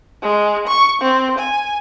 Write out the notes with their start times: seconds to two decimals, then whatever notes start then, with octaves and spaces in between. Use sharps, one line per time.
0.22 G#3
0.68 C#6
1.01 C4
1.38 G#5